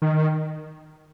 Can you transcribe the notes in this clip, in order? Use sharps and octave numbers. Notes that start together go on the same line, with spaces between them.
D#3